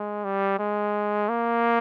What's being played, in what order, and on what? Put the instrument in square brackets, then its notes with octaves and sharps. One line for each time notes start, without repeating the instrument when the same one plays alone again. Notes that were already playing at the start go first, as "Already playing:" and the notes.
Already playing: [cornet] G#3
G3
G#3
A#3